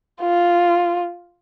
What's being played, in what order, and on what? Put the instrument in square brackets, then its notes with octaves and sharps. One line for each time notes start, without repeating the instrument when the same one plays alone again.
[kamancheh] F4